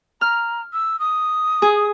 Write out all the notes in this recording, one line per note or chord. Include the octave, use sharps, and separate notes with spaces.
A#5 F6
E6
D#6
G#4